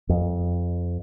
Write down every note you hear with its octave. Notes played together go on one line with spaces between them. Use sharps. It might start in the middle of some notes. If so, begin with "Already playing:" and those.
F2